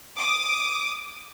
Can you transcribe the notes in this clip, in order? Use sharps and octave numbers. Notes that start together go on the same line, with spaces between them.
D6 D#6